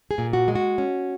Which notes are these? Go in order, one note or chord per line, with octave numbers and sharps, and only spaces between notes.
G#4
A#2
F#4
G#3
F#4
C#4